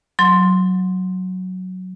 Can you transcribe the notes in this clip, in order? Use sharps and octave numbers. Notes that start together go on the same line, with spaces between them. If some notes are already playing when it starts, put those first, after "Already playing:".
F#3 C6